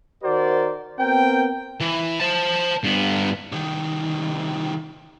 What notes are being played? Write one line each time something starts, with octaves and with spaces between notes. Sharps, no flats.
D#3 F#4 A#4 C5 D5
B3 C4 A#4 G5
E3
C5 A5
G2 B3
C2 D#3